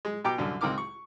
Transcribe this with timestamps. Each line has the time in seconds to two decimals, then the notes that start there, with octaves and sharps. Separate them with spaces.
0.05 G#3
0.25 B2 G4 G5 A#5 D6
0.38 C2 F#2 D3
0.61 C#2 C4 D#4 A#4 D6 F6
0.78 C#6